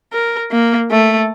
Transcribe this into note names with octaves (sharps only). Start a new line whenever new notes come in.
A#4
A#3
A3